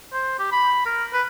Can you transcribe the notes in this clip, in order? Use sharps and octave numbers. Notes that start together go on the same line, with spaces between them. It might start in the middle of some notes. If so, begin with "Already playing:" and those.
C5
G4
B5
A#4
B4